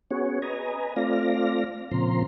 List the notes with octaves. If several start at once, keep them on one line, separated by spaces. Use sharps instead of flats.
B3 C#4 F#4 G#4 C#5
B4 D#5 G#5 A#5
A3 C4 F4 D5 F5 A#6
A#2 C#3 F3 C4 A#5 C6